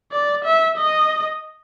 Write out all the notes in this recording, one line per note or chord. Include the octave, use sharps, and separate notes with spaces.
D5
E5
D#5